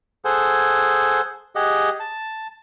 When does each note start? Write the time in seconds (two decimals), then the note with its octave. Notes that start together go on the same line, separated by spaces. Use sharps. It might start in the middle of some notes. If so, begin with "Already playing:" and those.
0.25 G#4 A4 C5 F#5 G#5
1.56 G4 G#4 D#5 F#5
2.00 A5